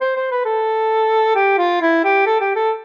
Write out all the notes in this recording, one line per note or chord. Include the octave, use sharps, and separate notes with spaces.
C5
C5
B4
A4
G4
F4
E4
G4
A4
G4
A4